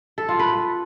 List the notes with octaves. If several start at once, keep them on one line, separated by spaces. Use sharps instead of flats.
A4
F4
B4